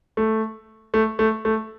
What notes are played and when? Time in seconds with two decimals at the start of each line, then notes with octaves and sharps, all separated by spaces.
0.17 A3
0.94 A3
1.19 A3
1.45 A3